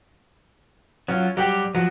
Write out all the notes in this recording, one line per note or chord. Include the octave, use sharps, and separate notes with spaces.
F#3 C#4 F4
F#3 G3 G4 G5
F3 F#3